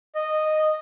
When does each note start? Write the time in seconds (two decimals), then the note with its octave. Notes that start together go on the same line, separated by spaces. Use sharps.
0.15 D#5